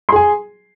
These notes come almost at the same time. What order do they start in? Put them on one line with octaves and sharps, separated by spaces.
C6 G#4 G#5